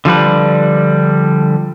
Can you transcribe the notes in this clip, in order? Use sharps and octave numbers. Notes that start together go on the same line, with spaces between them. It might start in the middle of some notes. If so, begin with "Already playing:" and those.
D3 F3 G3 B4